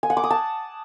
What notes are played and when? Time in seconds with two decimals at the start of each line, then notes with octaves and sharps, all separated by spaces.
0.03 G#5
0.10 F#5
0.17 D6
0.24 D#6
0.30 A5